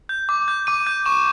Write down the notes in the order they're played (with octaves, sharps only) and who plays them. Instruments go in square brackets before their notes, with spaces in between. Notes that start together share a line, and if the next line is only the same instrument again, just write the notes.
[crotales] G6
D6
G6
D6 D#7
G6
C#6 E7